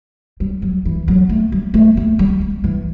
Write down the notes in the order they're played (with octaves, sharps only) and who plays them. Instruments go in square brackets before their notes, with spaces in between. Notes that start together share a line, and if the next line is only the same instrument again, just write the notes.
[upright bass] G3
F#3
E3
F#3
A3
G3
A3
A3
G3
G3
E3